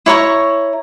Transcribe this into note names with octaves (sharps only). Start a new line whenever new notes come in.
E4 C#5 A#5 C#6